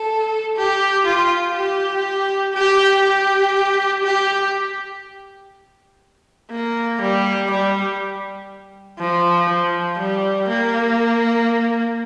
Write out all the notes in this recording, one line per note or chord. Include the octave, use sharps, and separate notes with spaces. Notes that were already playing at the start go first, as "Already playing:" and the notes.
Already playing: A4
G4
F4
G4
G4
G4
G4
A#3
G3
G3
F3
F3
G3
A#3